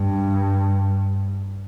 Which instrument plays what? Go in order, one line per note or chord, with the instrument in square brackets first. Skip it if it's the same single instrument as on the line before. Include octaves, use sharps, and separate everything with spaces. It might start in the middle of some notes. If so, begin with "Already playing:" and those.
Already playing: [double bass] G2